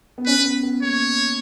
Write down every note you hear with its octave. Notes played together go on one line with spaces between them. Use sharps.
B3
C#4 B4
B3
B3
A#3 C#5